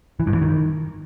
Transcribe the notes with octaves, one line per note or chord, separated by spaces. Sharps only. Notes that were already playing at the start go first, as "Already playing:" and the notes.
E3
G2
E3
D#3